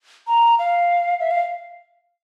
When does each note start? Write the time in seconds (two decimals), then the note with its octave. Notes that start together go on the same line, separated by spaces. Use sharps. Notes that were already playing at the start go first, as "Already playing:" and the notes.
0.27 A#5
0.59 F5
1.20 E5
1.31 F5